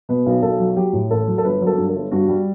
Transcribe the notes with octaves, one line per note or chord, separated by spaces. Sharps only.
B2 B4
B1
B1 A4
F#3
F#3 G4
A2
A1 A4
F#3
A4
G1 B4
F#3
A4
G2
A4
G1
G2 F#4
G3